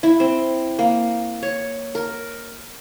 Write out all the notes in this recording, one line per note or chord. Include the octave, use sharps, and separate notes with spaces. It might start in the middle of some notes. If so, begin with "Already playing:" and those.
E4
C4
A#3
C#5
A#4